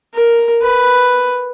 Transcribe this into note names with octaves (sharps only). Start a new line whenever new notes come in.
A#4
B4